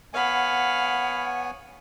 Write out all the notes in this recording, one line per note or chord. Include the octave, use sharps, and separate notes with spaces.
B3 C#5 F5 F#5 G#5 B5